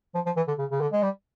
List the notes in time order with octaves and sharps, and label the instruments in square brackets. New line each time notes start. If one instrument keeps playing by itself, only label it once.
[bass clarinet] F3
F3
E3
D3
C#3
C#3
D3
G#3
G3